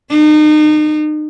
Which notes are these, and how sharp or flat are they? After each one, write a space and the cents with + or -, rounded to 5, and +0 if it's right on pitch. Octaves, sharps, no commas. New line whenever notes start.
D#4 -35